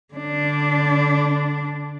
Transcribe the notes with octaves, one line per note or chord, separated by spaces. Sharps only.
D3 D4